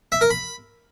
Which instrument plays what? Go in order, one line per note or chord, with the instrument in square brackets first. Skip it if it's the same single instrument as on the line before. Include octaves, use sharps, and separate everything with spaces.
[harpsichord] E5
A#4
B5